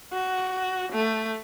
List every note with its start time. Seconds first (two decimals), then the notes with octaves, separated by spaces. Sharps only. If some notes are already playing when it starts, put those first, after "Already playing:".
0.13 F#4
0.92 A3